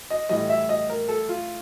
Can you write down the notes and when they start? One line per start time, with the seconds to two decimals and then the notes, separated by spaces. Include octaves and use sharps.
0.10 D#5
0.29 A2 E3 G3 D#5
0.50 E5
0.69 D#5
0.89 A#4
1.08 A4
1.29 F4